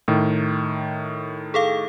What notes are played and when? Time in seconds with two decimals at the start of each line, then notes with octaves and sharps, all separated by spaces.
0.08 A2 D#3
1.54 G#4 A4 F5